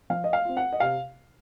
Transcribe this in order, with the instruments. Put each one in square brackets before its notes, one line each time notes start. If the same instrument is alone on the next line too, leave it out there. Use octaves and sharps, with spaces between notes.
[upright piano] F3 F5
D#5
F5
C4 F4
F#5
D#5
C3 F5